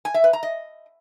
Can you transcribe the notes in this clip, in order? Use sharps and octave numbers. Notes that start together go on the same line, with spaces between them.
G#5
E5
B4
A#5
D#5